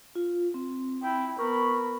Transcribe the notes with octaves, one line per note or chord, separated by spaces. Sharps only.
F4
C4
E4 G5
B3 A#4 B5 C#6